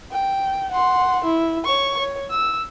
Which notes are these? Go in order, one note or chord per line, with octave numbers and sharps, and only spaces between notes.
G5
F#5 C6
E4
C#5 C#6
C#5
E6